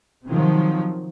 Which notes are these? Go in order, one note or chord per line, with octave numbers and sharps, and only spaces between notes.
C3 D#3 F3 F#3